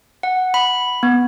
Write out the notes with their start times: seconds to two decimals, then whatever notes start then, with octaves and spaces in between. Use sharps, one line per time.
0.23 F#5
0.54 B5
1.03 B3